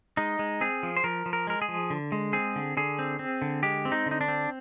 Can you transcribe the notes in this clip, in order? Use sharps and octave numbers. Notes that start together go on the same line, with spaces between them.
G#3 D#4
G#3
C4 G#4
F3
C5
F3 A#4
F3
A#4
G#3 A#4
G#4
F3
D3
G#3
C4 G#4
D3
D3 G#4
C4
C4
D3
G#3 G4
C4
D#4
D3
D#4
D4
C4